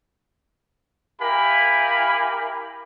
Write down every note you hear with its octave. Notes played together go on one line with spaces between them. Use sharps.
E4 G4 A#4 F5 G#5 B5